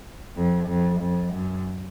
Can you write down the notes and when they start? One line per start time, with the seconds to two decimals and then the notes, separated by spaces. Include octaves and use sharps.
0.37 F2
0.68 F2
1.01 F2
1.34 F#2